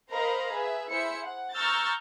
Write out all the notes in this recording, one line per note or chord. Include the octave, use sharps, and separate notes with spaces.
A#4 C5 D#5 F5 A#5 B5
G#4 B4 E5
E4 G#4 C5 E5 C#7
F#5
A#5 C#6 E6 F6 G6 A6